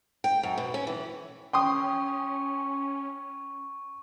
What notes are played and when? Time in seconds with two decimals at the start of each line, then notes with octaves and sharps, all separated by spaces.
0.24 G5
0.43 F#2
0.58 B2
0.74 C#4
0.87 E3
1.53 C#4 G5 C6 C#6 D#6